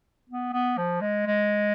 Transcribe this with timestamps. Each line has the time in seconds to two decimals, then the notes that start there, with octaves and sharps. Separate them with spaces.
0.30 B3
0.53 B3
0.78 F3
1.01 G#3
1.27 G#3